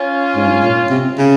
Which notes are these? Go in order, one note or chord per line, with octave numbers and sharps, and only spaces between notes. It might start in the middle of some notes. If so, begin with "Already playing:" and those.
Already playing: C#4 F4
G#2
G2
G#2
A#2
C3
C#3